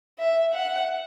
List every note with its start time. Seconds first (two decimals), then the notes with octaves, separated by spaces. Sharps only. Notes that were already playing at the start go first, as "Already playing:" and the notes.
0.18 E5
0.54 F#5